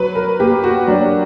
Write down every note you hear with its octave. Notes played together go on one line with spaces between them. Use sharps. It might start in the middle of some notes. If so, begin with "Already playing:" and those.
Already playing: F#3 B4
A#4
A#3 G4
F#4
F#3 D4